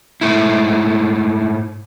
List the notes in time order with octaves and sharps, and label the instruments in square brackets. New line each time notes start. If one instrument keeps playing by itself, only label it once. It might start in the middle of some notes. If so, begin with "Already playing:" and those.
[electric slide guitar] G#2 A3 E4